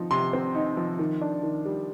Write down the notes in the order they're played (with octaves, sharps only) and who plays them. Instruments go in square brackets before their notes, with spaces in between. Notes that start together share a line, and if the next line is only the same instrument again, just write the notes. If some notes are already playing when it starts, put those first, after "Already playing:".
Already playing: [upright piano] F3 C4 D#4
C3 C6
C4
D#4
F3
D#3
D4
D#3
G3